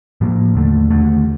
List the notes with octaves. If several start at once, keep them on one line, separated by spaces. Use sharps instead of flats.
A2 F3 A#3
D#2 D3 A3
D#2 D3 A3